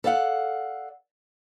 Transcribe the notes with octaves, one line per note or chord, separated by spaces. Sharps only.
A4 D5 F5 F#5